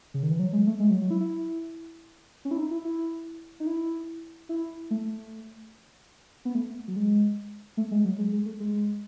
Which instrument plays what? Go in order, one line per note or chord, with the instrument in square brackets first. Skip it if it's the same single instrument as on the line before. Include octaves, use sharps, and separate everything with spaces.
[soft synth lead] C#3
D#3
E3
F#3
G#3
A3
G#3
F#3
F#3
E4
E4
C#4
E4
D#4
E4
E4
D#4
E4
E4
A3
B3
A3
F#3
G#3
A3
G#3
F#3
G#3
G#3
A3
G#3